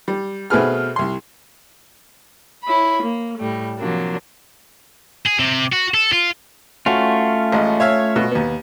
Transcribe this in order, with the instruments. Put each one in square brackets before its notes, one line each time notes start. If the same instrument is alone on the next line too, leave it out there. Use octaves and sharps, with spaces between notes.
[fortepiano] G3
B2 A3 C4 G#4 B4 F6
C2 C6
[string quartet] E4 C#5 B5
A#3
A2 G3 A3
C3 F3 F#3 A#3 D4
[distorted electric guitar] G#4
C3
F#4
A4
F4
[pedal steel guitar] A3 C#4 F4 [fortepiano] F#4
[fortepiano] A1 G#3
C#5 E5 F5
B2
D#2 B3